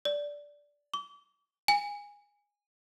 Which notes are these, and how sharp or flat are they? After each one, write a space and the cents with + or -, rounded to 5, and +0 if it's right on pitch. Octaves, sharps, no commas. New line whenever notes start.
D5 -10
D6 -40
G#5 -15